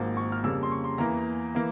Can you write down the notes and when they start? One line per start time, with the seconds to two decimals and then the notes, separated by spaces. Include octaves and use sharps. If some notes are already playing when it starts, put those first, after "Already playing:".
Already playing: G#1 G#2 F3 A#3
0.17 C#6
0.32 F6
0.44 F2 C#3 G3 A#3 E6
0.63 C6
0.72 C#6
0.84 C6
0.98 E2 E3 A#3 A#5
1.55 E3 A#3